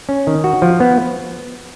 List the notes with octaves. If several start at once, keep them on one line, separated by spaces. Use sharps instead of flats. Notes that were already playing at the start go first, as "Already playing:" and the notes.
C#4
D#3
F#4
F3
B3